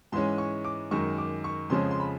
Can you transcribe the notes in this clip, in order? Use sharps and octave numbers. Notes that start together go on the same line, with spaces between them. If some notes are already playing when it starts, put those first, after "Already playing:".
G#2 E3 G#3 C#4 C6
C#6
D6
F#2 D#3 G#3 C#6
D6
C#6
F2 C#3 F3 G#3 C#4 C6
C6
B5